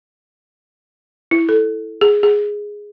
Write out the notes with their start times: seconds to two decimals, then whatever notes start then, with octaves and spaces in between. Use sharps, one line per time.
1.31 E4
1.49 A4
2.01 G#4
2.23 G#4